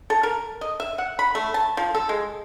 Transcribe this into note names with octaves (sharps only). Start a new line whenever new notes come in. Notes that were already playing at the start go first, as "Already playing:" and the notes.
A4
A#4
D#5
E5
F#5
B5
A3
A5
F3
A4
G#3